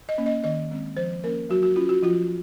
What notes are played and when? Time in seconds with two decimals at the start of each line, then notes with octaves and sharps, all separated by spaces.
0.09 D#5
0.18 A#3 C#4
0.26 D#5
0.44 D#3 D#5
0.71 G#3 C4
0.97 F3 C5
1.23 A#3 C#4 A#4
1.49 F#3 F#4
1.63 F#4
1.76 C#4 F4
1.89 F#4
2.03 F3 F4